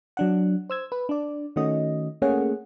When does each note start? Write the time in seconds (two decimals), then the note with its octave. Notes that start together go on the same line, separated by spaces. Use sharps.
0.17 F#3 D4 F#5
0.70 C5 E6 G#6
0.92 B4
1.09 D4 D5
1.56 D#3 A3 C#4 F#4 D#5
2.22 A3 A#3 C#4 G#4 C#5 F#5